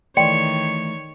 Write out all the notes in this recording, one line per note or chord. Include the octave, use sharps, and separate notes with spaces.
D#3 E3 A3 C#5 D5 G5 C6 C#7